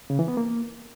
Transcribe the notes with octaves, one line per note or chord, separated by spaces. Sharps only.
C#3
E3
B3
A#3